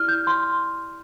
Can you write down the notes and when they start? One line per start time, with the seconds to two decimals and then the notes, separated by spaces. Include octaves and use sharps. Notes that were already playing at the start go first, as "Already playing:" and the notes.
Already playing: E4 G4 D5 F6
0.08 G6
0.27 C6